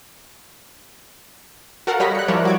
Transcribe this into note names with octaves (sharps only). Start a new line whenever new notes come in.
F#4 A4 A#4 F5 F#5
G3 C#5 D#5 B5 A#6 B6
F#6 C#7
F3 G3 E4 A#4 C#5 D5
F#4 D6 G#6